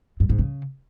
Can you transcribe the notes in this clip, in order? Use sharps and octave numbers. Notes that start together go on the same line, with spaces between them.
G2
G#2
C#3